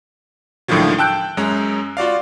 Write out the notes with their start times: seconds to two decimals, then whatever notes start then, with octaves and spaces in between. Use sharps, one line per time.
0.68 C#2 A2 D3 D#3 F3 F#3
0.98 G5 A5 E6 F#6 G6 D7
1.37 F#2 G#3 C#4 A#5
1.97 F4 F#4 D5 F5